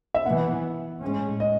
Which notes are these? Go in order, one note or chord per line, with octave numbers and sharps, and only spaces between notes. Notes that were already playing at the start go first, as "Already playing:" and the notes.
E5
E3 B3 F#5
A2 G#3 C#4
D#5